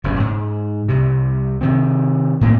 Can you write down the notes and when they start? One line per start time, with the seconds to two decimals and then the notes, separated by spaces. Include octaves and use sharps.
0.04 F#1 G2 B2 C#4
0.20 G#2
0.88 C2 C3
1.61 C3 D#3 C4
2.41 A2 A#3 C4